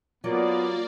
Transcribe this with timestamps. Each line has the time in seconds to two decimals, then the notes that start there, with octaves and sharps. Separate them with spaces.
0.24 F#3 A#3 B3 F4 D5